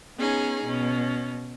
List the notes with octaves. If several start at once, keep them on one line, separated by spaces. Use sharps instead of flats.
B3 C#4 D#4 G#4
B2 C#4